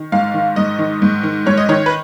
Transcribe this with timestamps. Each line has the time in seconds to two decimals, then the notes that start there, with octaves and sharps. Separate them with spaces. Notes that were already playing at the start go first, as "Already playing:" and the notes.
Already playing: D#3
0.12 G#2 F5
0.34 D#3
0.56 G#2 D#5
0.79 D#3
1.02 G#2
1.23 D#3
1.46 G#2 C#5
1.57 D#5
1.69 D#3 C#5
1.86 B4